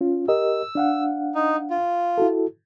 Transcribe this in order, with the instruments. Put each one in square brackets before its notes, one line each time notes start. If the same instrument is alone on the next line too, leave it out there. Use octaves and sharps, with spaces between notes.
[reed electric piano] C#4 F4
[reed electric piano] G4 A#4 D#5 [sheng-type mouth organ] E6
[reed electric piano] D4 F5 F#5
[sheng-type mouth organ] D#4
F4
[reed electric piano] E4 F#4 A4